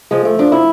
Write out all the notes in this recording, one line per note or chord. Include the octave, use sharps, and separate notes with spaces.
F3 G#3
A3
F3 D4
E4